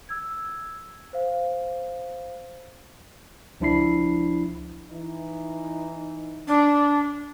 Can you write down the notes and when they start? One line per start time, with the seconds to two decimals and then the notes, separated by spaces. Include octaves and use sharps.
0.09 E6 G#6
1.13 C5 F5
3.60 C#2 F3 D4 E4 B5 C7
4.91 E3 D#4
6.47 D4